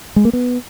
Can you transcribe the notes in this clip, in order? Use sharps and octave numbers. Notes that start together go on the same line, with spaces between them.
G#3
A#3
B3